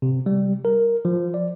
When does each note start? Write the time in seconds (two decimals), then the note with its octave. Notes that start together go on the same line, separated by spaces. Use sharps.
0.02 C3
0.26 G3
0.65 A#4
1.05 F3
1.34 D5